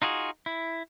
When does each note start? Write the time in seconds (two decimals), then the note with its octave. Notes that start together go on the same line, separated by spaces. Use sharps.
0.02 D#4 F4 F#4 G#4
0.46 E4